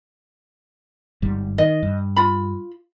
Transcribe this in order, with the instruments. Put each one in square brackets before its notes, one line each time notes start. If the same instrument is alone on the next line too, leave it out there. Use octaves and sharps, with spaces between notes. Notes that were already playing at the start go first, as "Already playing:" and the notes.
[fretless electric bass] G1 G#2 G3
[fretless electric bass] D#3 [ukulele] D#5
[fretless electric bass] G2
[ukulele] F4 B5